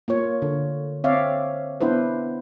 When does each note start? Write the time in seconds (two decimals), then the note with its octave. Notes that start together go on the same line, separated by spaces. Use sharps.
0.08 A#3 F4 C#5
0.42 D3
1.04 C4 C#5 D5 E5 F5
1.81 B3 D4 E4 B4 C5